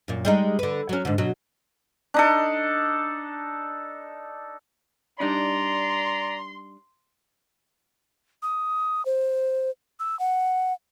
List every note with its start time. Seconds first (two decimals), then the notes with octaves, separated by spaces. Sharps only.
0.08 F#2 A#2
0.25 G3 G#3 D#4
0.59 D3 B4
0.89 F#3 C#4
1.05 G#2 D3
1.18 B2 F#3
2.14 D4 D#4 A4
5.20 G3 D4 D#4 D5 A#5 C6
8.43 D#6
9.05 C5
10.00 E6
10.20 F#5